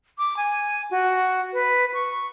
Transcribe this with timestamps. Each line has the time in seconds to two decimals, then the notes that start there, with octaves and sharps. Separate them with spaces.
0.18 D6
0.37 G#5
0.91 F#4
1.53 B4
1.94 C#6